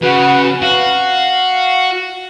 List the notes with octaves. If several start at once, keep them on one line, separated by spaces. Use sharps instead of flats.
C#3 F#4 B4 F#5
F#4 F5